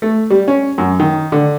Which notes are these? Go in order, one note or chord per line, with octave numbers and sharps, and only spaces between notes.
A3
G3
C#4
F#2
D#3
D3